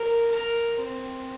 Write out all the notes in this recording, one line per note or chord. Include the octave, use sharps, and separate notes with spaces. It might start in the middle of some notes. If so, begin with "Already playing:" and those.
Already playing: A#4
A#4
C4